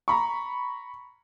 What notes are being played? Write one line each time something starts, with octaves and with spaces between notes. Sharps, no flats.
A#5 B5 C#6